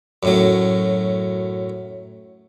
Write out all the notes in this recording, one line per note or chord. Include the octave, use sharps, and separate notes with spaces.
F#2 A2 F#3